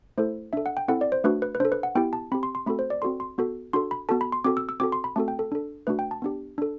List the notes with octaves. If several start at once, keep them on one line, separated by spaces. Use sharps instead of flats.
A3 E4 A4 C5
D4 A4 E5
F#5
G5
C4 E4 A4 F#5
D5
C5
A3 D4 F#4 B4
B4
B4
D4 A4 C5
B4
F#5
B3 E4 G4 G5
A5
C4 G4 B5
C6
C6
A3 C4 F#4 A4 B5
C5
D5
C4 F#4 A4 C6
C6
B3 F#4 A4
D4 F#4 A4 C6
B5
B3 F#4 A4 A5
B5
C6
C4 F#4 A4 D6
E6
E6
C4 F#4 A4 D6
C6
B5
A3 C4 F#4 A4 A5
G5
A4
D4 A4
A3 D4 F#4 B4
G5
A5
B3 D4 G4
D4 A4